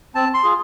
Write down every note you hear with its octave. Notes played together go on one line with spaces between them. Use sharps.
C4 A5
C6
F4 G#4